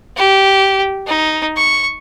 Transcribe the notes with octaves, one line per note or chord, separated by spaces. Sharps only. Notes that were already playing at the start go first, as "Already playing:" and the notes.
G4
D#4
C#6